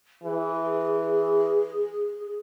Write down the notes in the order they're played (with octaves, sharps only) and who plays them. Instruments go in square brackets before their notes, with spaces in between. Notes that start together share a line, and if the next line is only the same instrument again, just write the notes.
[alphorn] E3 [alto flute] G#4